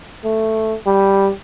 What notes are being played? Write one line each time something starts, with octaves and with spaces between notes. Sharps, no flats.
A3
G3